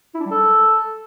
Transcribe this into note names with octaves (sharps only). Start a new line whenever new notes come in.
E4
D4
G3
A4